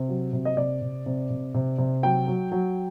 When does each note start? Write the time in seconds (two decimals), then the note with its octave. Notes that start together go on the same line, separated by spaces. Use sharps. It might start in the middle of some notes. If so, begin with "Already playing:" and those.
Already playing: C3
0.09 F#3
0.33 C3
0.45 D#5
0.56 C3 D5
0.81 C3
1.06 C3
1.30 C3
1.54 C3
1.78 C3
2.03 F#3 G5
2.27 F#3
2.52 F#3